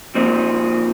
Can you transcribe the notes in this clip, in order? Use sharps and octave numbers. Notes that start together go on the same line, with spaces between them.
A#2 F3 C4 D#4